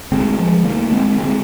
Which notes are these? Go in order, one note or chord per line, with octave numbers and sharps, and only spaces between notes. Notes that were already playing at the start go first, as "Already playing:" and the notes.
D2 D3 G#3 C4
F3 G#3
D3 G3 A#3
D2
G#3 C4
D3 G#3 C4